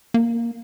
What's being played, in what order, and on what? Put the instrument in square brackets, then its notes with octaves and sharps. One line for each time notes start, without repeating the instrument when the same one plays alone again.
[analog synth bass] A#3